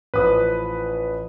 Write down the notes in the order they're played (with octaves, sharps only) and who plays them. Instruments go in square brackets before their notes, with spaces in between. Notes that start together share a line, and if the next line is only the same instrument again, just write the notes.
[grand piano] A1 F3 D#6 [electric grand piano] B4